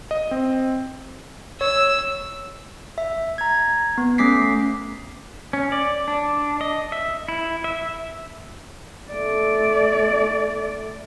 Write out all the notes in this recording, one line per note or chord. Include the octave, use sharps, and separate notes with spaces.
D#5
C4
C#5 E6
E5
A#5 G#6
B3
A3 C#4 D6 B6 C7
C#4
D5
D4
D#5
E5
E4
E5
A3 D5